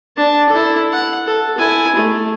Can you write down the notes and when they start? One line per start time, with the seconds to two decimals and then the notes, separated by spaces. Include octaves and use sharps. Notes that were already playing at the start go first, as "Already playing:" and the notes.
0.17 D4 A5
0.50 E4 A4
0.93 F#5
1.26 A4
1.58 E4 G#5
1.96 A3